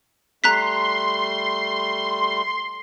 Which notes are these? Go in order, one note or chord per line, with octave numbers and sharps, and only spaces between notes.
G3 A3 A#5 C6 F#6 B6